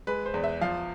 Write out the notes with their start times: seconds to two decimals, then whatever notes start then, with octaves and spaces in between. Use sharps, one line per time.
0.07 G#3 B4
0.26 C5
0.34 E2
0.44 E5
0.61 F3 F5